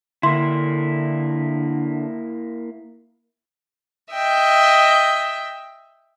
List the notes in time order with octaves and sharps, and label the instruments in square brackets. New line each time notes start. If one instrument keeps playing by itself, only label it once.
[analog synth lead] D3 [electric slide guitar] A#3 E4 [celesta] C6
[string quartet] D#5 E5 G5